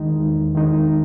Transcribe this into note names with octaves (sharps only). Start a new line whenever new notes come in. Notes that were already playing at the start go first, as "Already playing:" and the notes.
Already playing: E2 D#3 G#3 D#4
E2
D#3 G#3 D#4